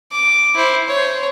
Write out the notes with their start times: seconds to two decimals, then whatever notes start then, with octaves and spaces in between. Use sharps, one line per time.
0.12 D6
0.55 E4 C5
0.87 C5 C#5